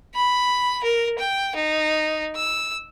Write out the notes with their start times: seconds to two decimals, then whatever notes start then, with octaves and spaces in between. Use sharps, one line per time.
0.15 B5
0.84 A#4
1.19 G5
1.56 D#4
2.36 E6